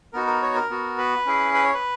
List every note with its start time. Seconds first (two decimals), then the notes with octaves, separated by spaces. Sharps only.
0.13 B3 D#4 F#4 A#4
0.27 A#4
0.42 C#5
0.55 A#4
0.70 B3 F#4
0.98 B4
1.26 C#4 E4 G#4
1.54 B4
1.64 C#5
1.74 B4